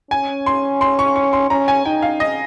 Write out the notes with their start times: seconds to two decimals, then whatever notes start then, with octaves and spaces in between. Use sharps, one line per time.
0.11 C#4 G#5
0.46 C6
0.81 C6
0.99 C#6
1.16 C#6
1.33 C6
1.50 C#4 A#5
1.68 G#5
1.85 D#4 G5
2.02 F5
2.20 D#5